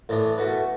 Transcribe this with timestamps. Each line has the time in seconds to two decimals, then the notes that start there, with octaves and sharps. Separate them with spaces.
0.09 A1 A2 E3 D4
0.38 B2 A3 F#4 B4